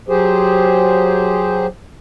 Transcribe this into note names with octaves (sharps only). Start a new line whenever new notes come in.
F#3 G4 G#4 C5